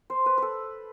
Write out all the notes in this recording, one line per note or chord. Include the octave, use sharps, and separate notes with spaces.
C5
B4
A4 B4